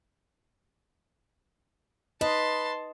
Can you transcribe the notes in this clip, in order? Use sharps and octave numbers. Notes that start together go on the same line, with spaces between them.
B4 D#5 A5 C6